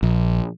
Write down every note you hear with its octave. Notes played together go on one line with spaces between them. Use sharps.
A#1